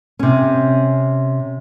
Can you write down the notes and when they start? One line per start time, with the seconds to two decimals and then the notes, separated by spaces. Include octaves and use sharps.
0.19 C3 C#4